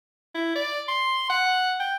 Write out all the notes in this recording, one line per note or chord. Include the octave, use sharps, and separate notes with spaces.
E4
D5
C6
F#5
G5